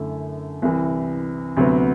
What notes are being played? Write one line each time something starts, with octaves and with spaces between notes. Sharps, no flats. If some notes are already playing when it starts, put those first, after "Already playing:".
Already playing: F#2 D3 A3 E4
C2 C3 E3
D2 C3 F#3 B3